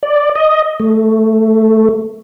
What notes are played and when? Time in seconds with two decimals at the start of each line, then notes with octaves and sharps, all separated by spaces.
0.03 D5
0.35 D#5
0.80 A3